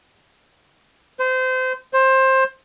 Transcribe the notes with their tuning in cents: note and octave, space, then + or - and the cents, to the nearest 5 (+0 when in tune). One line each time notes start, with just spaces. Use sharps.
C5 -25
C5 +20